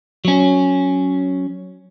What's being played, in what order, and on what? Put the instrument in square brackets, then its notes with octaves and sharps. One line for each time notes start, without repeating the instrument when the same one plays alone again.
[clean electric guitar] F#3 C#4